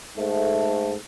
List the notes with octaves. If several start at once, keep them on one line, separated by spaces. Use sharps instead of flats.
G#2 A3